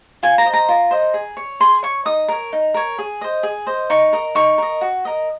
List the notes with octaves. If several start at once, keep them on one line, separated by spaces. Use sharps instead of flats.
F4 G#5
A#5
C5 D#5
A#5
F4
C5 D#5
G#4
C#5
G#4 C6
C#5 C#6
D#4 D#6
A#4 C#5
D#4
A#4 C#5
G#4
C5 D#5
G#4
C5 D#5
D#4 C#6
A#4 D#5
D#4 C#6
A#4 D#5
F#4
A#4 D#5